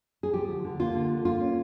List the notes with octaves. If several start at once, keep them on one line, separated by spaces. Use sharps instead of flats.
G#4
F3 G4
D2
D3
A#3 F4
D3
D2
A#3 F4
C#4